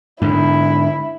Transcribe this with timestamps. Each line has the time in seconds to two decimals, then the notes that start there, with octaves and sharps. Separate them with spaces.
0.22 G#2 D3 E4